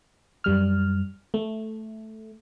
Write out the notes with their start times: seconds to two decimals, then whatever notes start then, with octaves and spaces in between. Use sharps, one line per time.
0.44 F#2 G3 F6
1.34 A3